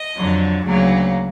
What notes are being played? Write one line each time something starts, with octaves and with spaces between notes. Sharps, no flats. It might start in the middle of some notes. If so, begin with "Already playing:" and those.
Already playing: D#5
F2 D3 F#3
D2 C#3 F#3 A#3